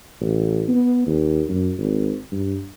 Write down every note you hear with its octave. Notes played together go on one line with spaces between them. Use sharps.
A1
B3
D#2
F#2
G#1
G2